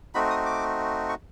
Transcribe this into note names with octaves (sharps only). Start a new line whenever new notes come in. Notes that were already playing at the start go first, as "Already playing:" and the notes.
A3 C4 D#4 F#4 B5
D#6
D6
C#6